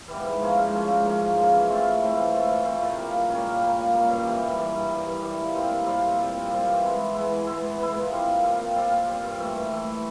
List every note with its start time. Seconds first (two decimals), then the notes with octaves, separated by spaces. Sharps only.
0.08 E3 G3 B3
0.24 G#2
0.40 F3 A#3 C#4
0.56 G#2
0.73 F3 A#3 C#4
0.89 G#2
1.05 F3 A#3 C#4
1.20 G#2
1.37 F3 A#3 C#4
1.53 E3
1.68 A3 C4 F4
1.85 E3
2.01 A3 C4 F4
2.17 E3
2.33 A3 C4 F4
2.49 E3
2.65 A3 C4 F4
2.81 A#2
2.97 G3 A#3 C#4
3.14 A#2
3.29 G3 A#3 C#4
3.45 A#2
3.61 G3 A#3 C#4
3.77 A#2
3.94 G3 A#3 C#4
4.10 G2
4.26 E3 G3
4.42 G2
4.58 E3 G3
4.74 G2
4.90 E3 G3
5.06 G2
5.22 E3 G3
5.38 A#2
5.54 G3 C4 F4
5.70 A#2
5.86 G3 C4 F4
6.02 A#2
6.18 G3 C4 F4
6.35 A#2
6.51 G3 C4 F4
6.67 E3
6.82 G#3 B3 E4
6.99 E3
7.15 G#3 B3 E4
7.30 E3
7.47 G#3 B3 E4
7.63 E3
7.79 G#3 B3 E4
7.95 A#2
8.11 G3 C4 F4
8.27 A#2
8.43 G3 C4 F4
8.59 A#2
8.75 G3 C4 F4
8.91 A#2
9.07 G3 C4 F4
9.23 G2
9.39 E3 A3
9.55 G2
9.71 E3 A3